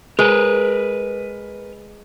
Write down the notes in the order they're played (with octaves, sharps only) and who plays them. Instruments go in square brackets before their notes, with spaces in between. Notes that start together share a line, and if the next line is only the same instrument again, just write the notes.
[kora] G#3 [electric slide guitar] A#4 B4